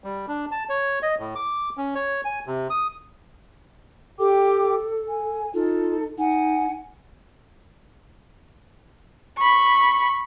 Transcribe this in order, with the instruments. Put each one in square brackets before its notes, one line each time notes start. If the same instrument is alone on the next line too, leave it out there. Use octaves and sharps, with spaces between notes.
[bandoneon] G3
D4
A5
C#5
D#5
A2
D6
C#4
C#5
G#5
C3
D#6
[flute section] G4 G5 D6 [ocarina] A4
[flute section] G#5
[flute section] D#4 A4 [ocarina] F4
[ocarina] D#4 [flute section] F#5 G#5
[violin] B5 C#6